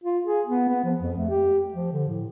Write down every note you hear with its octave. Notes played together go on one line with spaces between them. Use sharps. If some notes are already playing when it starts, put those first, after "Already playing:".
F4
G#4
B3
B3
F3
F2
A3
G4
F3
D3
A2